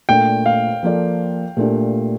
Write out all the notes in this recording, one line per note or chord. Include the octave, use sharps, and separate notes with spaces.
A#2 A3 D4 G5
F5
F3 A#3 F4 A4 D5
A#2 A3 D4 G4